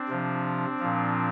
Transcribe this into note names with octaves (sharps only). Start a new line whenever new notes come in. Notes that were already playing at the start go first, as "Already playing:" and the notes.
Already playing: C4 D4
C3 F3
A#2 F3